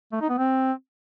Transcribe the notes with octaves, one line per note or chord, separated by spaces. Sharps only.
A3
D#4
B3
C4